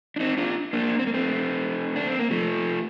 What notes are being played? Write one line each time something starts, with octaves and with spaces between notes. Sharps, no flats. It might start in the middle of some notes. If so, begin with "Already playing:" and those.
D4
C4 D#4
D4 F4
A#3 D4
C4
A#3
A3 C4
D4
C4
A#3
F3 A3